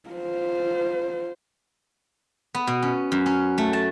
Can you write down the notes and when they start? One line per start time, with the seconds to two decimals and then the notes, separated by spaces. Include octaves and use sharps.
0.10 F4 C5
2.54 B3
2.67 B2
2.82 C#4
3.12 F#2
3.26 C#4
3.58 A3
3.73 A5